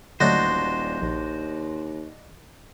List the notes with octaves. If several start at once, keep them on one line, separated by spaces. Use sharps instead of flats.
D#1 D3 F#3 A3 D4 D#4 F#4 C5
A#1 D#2